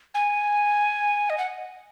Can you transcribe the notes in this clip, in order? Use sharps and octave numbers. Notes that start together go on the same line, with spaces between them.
G#5
D#5
F#5